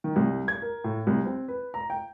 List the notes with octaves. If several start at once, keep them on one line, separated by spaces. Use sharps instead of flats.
D#3
C2
G#6
A#4
A2
C2
C4
B4
A#5
G5